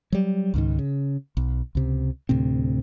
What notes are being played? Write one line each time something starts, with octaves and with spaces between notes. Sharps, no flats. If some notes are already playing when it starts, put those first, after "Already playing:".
F#3 G3
C#2 G#2 D#3
C#3
B1
C#2 C3
D2 A2 C3 C4